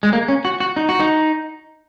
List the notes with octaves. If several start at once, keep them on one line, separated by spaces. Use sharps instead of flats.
G#3
A#3
C#4
F#4
F#4
D#4
F#4
D#4